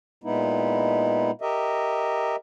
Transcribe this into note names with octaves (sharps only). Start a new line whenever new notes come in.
A#2 G#3 B3 D#4 E4
G4 A#4 D#5 E5